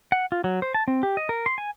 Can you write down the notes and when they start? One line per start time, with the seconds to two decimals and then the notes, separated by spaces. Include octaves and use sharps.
0.12 F#5
0.32 F4
0.44 F#3
0.62 C5
0.74 A5
0.88 C4
1.03 G4
1.17 D#5
1.29 A#4
1.46 C6
1.58 G#5